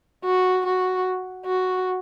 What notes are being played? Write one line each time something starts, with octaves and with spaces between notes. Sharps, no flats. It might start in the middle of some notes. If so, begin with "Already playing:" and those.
F#4
F#4
F#4